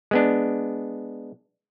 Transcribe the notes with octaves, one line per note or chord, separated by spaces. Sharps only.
G#3 B3 D4